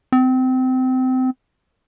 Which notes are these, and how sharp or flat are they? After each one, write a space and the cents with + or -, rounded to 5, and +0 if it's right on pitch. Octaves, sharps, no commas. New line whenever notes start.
C4 -25